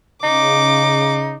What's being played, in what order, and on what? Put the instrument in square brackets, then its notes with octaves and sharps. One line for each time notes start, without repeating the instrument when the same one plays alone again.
[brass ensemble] C#3 [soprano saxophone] D#4 [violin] D6